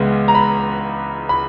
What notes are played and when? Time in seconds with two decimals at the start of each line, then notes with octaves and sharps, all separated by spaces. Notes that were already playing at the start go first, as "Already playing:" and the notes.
Already playing: C#2 C#3 E3 G#3 B3
0.28 A#5
0.35 B5
1.29 B5